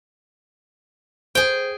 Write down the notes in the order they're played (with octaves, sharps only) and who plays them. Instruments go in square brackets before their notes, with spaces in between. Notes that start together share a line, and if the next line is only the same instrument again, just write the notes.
[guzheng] G#4 G5 [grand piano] C5